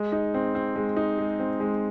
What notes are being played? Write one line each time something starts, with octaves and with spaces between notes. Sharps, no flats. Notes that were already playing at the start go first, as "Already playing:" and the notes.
Already playing: G#3
D#4
C4
C4
G#3
D#4
G#3
C4
G#3